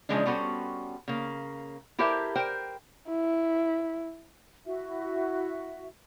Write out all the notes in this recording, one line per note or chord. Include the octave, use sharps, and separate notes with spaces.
C#3 E3 F3 G#3 C#4 D4
G3 B3 C#4 F#4 A4 C5
C#3 A#3
E4 G4 A4 A#4 C5 E5
A#4 C5 G5
E4
E4 F#4 E5